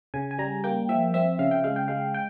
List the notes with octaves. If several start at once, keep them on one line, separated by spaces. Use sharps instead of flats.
C#3 G#5
G#5
G3 A#5
A#3 G5
F3 E5
C4 E5
C#3 F5
G5
G#3 F5
G5
G#3 F5
G5